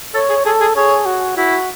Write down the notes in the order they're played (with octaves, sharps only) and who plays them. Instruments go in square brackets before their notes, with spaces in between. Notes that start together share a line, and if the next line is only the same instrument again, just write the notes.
[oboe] A4 [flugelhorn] C#5
[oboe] G#4
[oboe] G#4 [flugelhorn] A4
[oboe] G#4
[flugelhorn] G#4 [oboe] C#5
[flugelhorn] F#4
[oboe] E4 [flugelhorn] F#4